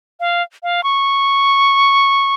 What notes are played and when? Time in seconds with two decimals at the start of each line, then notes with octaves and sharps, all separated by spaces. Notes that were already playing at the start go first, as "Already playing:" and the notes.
0.20 F5
0.63 F5
0.84 C#6